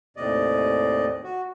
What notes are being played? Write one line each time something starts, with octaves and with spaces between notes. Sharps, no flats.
D#2 A2 C3 D5 D#5
F#4